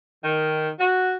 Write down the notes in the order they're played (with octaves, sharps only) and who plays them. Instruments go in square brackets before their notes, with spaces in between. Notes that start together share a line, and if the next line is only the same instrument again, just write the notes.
[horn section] D#3
F#4